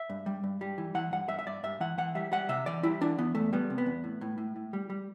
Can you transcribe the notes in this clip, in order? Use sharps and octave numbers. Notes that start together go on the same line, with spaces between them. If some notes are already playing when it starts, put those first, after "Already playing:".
Already playing: E5
G2
G3
G2
G3
E3
E3 F#5
G2 F#5
G2 E5
E5
G2 D5
G2 E5
E3 F#5
E3 F#5
G3 E5
G3 F#5
C3 E5
E3 D5
G3 E4
E3 D4
E3 B3
E2 A3
G3 B3
C3
B3
E2
A2
A2
A2
A2
G3
G3